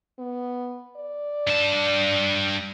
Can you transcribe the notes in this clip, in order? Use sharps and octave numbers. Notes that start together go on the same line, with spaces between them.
B3
D5
G2 A5